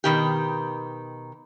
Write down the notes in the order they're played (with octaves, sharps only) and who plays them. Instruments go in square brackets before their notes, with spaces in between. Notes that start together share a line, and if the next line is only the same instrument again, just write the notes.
[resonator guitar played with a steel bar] B2 D#3 G4